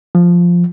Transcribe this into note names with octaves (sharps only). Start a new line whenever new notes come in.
F3